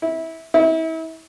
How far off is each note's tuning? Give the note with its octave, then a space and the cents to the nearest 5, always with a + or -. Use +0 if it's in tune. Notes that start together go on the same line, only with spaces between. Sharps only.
E4 -20
E4 -35